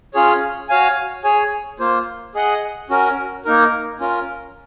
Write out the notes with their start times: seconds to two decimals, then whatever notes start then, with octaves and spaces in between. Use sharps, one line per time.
0.14 C#4 F4 G#4 C#5
0.69 F#4 C#5 F5 G#5
1.24 G#4 C#5 G#5
1.80 A#3 F4 C5
2.35 G#4 D#5 F#5
2.90 C#4 F#4 A#4
3.45 A#3 D#4 A#4
4.00 C#4 F4 A#4